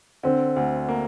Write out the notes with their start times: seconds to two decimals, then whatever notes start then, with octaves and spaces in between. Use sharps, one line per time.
0.23 D3 C4
0.56 D2
0.89 A#3